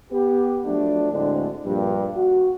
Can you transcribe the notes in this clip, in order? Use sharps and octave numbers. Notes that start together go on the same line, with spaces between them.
B3 G4
F3 F#3 A3 D4
D2 A2 D3 G#3 C4 D4
A#1 G2
F#4